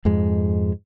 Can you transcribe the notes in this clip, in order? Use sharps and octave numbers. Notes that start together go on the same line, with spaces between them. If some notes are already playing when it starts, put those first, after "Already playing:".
F2 G#2 G#3